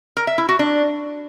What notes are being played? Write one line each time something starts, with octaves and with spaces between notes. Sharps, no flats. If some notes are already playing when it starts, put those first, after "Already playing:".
A#4
E5
E4
F#4
D4